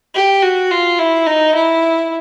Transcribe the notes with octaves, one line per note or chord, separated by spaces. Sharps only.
G4
F#4
F4
E4
D#4
E4